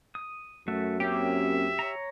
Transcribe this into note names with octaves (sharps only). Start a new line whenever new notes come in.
D#6
F#2 A3 F#4 E5
A#3 C4 C#4 G4 E5
C#5 A#5